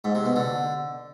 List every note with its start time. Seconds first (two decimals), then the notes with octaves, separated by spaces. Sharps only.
0.04 G#2
0.15 C3
0.25 B2
0.36 D3